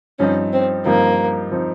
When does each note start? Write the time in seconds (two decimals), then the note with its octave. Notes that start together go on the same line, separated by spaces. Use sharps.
0.19 G2 F3 C4 C#4 D#4
0.53 C4
0.85 G2 F3 A#3 C4 D#4
1.52 F3 C4 D#4